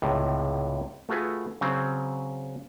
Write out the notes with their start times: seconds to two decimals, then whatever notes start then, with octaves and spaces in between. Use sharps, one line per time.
0.02 C#2 A2 C3
1.09 A3 F4 F#4 G#4 B4
1.61 C#3 F#3 C4